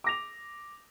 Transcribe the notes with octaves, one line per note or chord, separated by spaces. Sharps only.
D6 A#6 F7